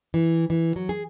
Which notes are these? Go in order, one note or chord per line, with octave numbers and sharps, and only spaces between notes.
E3
E3
F#3
G#4